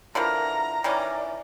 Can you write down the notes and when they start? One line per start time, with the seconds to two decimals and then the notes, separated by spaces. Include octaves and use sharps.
0.15 D3 E3 F3 A#4 A#5
0.84 D#3 E3 C#4 D5